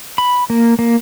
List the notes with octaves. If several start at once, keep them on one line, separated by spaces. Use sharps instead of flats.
B5
A#3
A#3